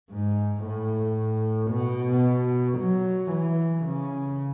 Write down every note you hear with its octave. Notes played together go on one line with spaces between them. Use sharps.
G#2
A2
B2
F#3
E3
C#3